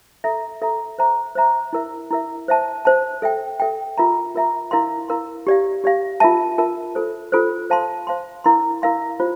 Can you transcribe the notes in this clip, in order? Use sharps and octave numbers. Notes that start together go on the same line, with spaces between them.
A4 E5 A#5
A4 E5 A#5
C5 E5 A#5
C5 E5 A#5
E4 A#4 E5
E4 A#4 E5
C5 E5 A5
C5 E5 A5
A4 E5 G5
A4 E5 G5
F4 A#4 E5 A#5
F4 A#4 E5 A#5
E4 A#4 F5 C6
E4 A#4 F5 C6
G4 D5 F5
G4 D5 F5
F4 A#4 E5 A5
F4 A#4 E5 A5
F4 A4 C5
F4 A4 C5
C5 F5 A5 C6
C5 F5 A5 C6
E4 A#4 F5 C6
E4 A#4 F5 C6
F4 C5